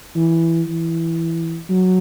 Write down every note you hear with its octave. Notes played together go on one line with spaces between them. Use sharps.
E3
E3
F#3